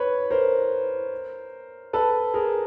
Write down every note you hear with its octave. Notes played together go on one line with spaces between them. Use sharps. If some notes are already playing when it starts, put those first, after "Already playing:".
Already playing: B4 C#5
A#4 C5
A4 B4
G#4 A#4